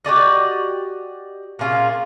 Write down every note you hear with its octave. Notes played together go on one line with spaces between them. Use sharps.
F#4 G4 D5 D#5
A#2 C#4 F4 G#4